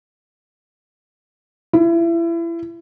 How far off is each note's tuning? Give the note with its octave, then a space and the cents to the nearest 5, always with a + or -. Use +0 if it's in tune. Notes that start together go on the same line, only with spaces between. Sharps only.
E4 +30